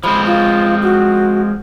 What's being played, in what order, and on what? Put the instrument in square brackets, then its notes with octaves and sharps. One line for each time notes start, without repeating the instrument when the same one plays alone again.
[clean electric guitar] F3 G#3 C4 [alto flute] B5
[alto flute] F4
F#4